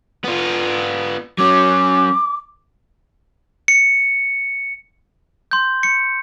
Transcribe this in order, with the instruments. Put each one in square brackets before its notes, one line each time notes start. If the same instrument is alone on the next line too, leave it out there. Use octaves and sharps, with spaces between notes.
[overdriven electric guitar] B3 F4
[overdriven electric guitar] F#3 C#4 [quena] D6
[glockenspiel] C#7
C6 G6
C#7